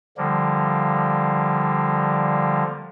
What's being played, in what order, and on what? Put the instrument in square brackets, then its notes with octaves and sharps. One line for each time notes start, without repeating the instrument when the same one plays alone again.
[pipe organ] D3 F3 G3 A#3